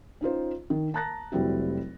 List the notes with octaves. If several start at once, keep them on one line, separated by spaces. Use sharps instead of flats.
C#4 D#4 F4 C5
D#3
A5 A#5 F#6 A6 A#6
F1 F#3 G3 C4 E4 F#4